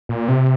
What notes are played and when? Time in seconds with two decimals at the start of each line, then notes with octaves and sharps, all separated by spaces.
0.09 A#2
0.28 C3